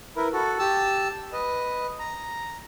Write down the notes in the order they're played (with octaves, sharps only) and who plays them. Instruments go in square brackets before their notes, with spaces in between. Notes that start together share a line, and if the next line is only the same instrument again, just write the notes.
[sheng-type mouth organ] E4 A#4 B4
F#4 A4
G4 A5 E6
B4 D#5
A#5